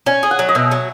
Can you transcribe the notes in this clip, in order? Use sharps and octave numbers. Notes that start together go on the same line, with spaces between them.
C#4 G#5
G#4
F#5
F#3
D#5
B2 E5
F#3